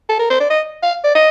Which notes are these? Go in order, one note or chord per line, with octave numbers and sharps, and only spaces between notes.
A4
A#4
C5
D5
D#5
F5
D5
D#5